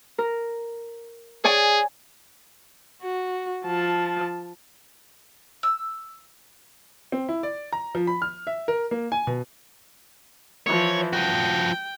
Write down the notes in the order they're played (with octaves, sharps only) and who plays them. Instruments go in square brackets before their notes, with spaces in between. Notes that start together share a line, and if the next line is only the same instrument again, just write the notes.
[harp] A#4
[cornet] G#4 [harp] C#5 D5 G#5
[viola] F#4
F3 A5
[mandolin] E6
[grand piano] C4
E4
D5
A#5
F3
B5
F6
E5
A#4
A#3
G#5
B2
[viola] E3 F3 [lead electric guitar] C#5
[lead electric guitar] F3 F#4 [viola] G5